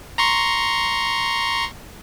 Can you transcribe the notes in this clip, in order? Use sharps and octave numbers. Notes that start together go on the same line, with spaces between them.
A#5 C6 C#6